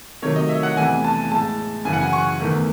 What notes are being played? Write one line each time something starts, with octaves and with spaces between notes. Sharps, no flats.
C3 D#3 F#3 A3 C#5
D#5
E5
F#5
E2 C3 E3 A3 G#5
A5
A2 G#3 A5
F#2 C#3 E3 G#5
F#5
G#5
C#6
E2 D#3 A3